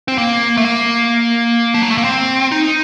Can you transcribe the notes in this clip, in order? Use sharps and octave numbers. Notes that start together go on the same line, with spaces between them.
C4
A#3
A3
A#3
F3
F#3
A3
A#3
C4
D#4